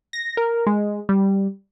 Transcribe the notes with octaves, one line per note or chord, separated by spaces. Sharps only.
A#6
A#4
G#3
G3